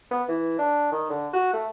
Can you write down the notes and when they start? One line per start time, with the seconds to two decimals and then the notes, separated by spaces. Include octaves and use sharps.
0.11 B3
0.29 E3
0.59 D4
0.92 D#3
1.10 D3
1.33 F#4
1.53 A3